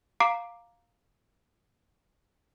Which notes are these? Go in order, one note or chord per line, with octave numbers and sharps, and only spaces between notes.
F5 A#5 D6 C7 D7